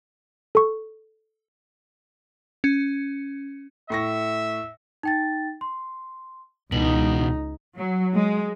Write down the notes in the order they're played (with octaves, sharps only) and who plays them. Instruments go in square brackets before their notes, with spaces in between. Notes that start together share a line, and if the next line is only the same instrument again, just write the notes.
[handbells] A4 C#6
[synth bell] C#4
[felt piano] A2 C#6 A#6 [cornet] E5
[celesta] D#4 G5 A6
C6
[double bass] C#2 D#4 [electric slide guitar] B2 D#3 E3 [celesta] F#7
[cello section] F#3
G#3